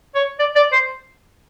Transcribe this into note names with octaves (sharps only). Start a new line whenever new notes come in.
C#5
D5
D5
C5